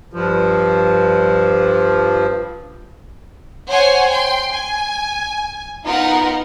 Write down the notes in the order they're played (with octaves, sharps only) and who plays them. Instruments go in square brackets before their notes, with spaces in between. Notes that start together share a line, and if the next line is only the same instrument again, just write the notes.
[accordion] G2 F3
[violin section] C5 C#5 F#5 G#5 C6
G5 C6
G#5
B3 D#4 F4 A#4 F#5 A#5